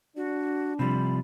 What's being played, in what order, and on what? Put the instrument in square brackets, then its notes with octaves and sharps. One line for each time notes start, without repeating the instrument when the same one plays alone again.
[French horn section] D4 [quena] F#4
[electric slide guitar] C3 F3 G3 [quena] B5